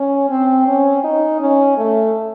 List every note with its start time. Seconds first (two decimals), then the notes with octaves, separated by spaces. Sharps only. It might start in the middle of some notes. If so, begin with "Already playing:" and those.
Already playing: C#4
0.30 C4
0.67 C#4
1.04 D#4
1.41 C#4
1.77 A3